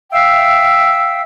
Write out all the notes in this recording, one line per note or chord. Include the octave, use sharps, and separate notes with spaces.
E5 F5 G5 E6